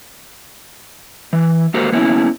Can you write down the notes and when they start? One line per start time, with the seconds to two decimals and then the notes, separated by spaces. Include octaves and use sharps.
1.33 E3
1.74 A#3 F#4 G4 A4 A#4 C5
1.92 A#3 B3 C#4 E4